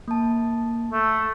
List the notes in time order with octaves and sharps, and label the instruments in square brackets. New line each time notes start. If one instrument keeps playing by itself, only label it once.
[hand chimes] A#3 A5
[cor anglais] A3